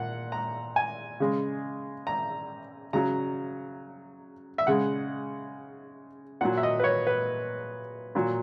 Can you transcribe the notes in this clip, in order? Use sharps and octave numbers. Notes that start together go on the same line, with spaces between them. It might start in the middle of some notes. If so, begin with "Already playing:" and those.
Already playing: A#2 F#5
A#5
G#5
C#3 G#3
A#5
C#3 F#3 A#5
E5
C#3 G#3 F#5
A#2 F#3 F#5
E5
D#5
B4
C#5
B4
A#2 F#3